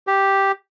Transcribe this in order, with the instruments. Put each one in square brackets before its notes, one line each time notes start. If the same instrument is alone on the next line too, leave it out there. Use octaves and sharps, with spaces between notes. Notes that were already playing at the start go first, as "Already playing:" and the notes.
[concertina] G4